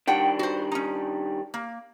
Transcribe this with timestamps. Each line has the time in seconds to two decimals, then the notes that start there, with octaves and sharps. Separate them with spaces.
0.07 D#3 G3 D4 F#5 G5
0.39 F#4 C5
0.72 C#4 D#4
1.54 A#3